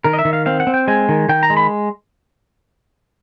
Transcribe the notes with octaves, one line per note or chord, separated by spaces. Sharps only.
D#3 A#4
D#5
E5
D#3
F5
C4 F5
F#5
C4
G5
G#3 G#5
D#3
D#3 G5
A#5
G#3
B5